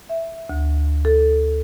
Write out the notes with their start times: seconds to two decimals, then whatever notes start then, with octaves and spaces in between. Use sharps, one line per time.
0.09 E5
0.49 D2
1.05 A4